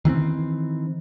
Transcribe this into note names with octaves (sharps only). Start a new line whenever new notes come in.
D#3 E3 B3 C4